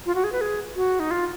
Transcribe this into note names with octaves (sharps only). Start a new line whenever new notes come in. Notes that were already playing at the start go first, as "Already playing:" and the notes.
F4
F#4
G#4
B4
G#4
F#4
D#4
F4